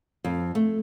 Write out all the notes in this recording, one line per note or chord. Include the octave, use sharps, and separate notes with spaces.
F2
A3